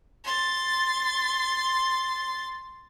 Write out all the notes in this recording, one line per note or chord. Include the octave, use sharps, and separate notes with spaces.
C6 A6